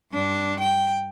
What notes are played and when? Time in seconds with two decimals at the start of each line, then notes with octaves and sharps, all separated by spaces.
0.12 G2 D4
0.60 G5